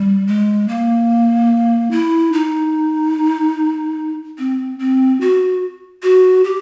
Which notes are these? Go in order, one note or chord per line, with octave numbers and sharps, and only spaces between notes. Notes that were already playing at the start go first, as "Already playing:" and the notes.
Already playing: G3
G#3
A#3
E4
D#4
C4
C4
F#4
F#4
G4